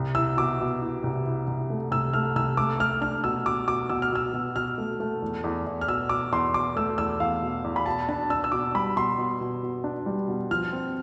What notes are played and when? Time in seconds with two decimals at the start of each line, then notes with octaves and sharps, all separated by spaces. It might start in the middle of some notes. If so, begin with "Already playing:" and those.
Already playing: C2
0.15 E4 E6
0.37 B2 D6
0.60 B2
0.82 E4
1.03 C2
1.26 E4
1.47 C2
1.70 A3
1.91 C2 E6
2.14 A3 F6
2.36 C2 E6
2.57 A3 D6
2.80 A3 F6
3.01 D4 F6
3.24 B2 E6
3.46 B2 D6
3.67 B2 D6
3.89 B2 E6
4.02 F6
4.12 B2 E6
4.33 B2
4.56 B2 F6
4.78 A3
5.00 A3
5.22 E2
5.44 E2
5.67 E2
5.81 F6
5.88 B2 E6
6.09 B2 D6
6.32 E2 C6
6.54 B2 D6
6.76 A3 E6
6.98 E2 E6
7.20 E2 F5
7.42 B2
7.64 E2
7.76 B5
7.86 B2 A5
8.08 D4 A5
8.30 D4 E6
8.44 E6
8.52 B2 D6
8.75 G3 B5
8.96 B2 C6
9.18 B2
9.41 B2
9.63 B2
9.84 D4
10.06 G3
10.28 B2
10.50 F3 F6
10.73 C4